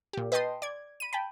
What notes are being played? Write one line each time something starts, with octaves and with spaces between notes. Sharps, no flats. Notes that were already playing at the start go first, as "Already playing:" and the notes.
A#2 G4
B4 D#5 G5 A5 C6 D#6
D5 G#6
B5 D#7
G5 A5 B5